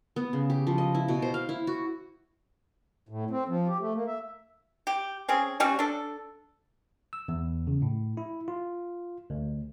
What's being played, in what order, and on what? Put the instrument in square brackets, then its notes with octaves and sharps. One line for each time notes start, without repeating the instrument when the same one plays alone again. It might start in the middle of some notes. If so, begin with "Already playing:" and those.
[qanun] B3
C#3
G4
F3
D#5
E4
B2
C5
F5
E4
F#4
[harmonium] A2
C4
F3
G4
A3
A#3
E5
[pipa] G4
C4 C#4 G#4
G3 C#4 F#4
D4 A4
[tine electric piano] E6
E2
C#3
A2
E4
F4
D2